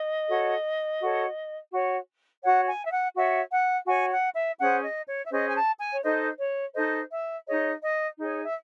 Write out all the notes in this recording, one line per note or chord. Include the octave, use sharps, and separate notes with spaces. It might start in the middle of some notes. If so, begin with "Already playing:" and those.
Already playing: D#5
F#4 A4 C#5
F#4 A4 C#5
F#4 C#5
F#4 C#5 F#5
G#5
E5
F#5
F#4 C#5 E5
F#5
F#4 C#5 G#5
F#5
E5
C#4 G#4 C5 F#5
D#5
C#5
E5
C#4 G#4 C5 D#5
G#5
A5
G#5
C#5
D#4 A4 C5 D#5
C#5
D#4 A4 C5 D#5
E5
D#4 G#4 C#5 D#5
D#5
D#4 G#4 C#5
E5